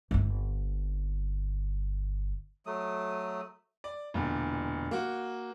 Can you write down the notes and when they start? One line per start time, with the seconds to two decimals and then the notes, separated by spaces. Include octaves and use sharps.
0.11 G1 C4
2.66 F#3 A3 D#6
3.84 D5
4.14 E1 A#2 D3
4.91 A#3 F#4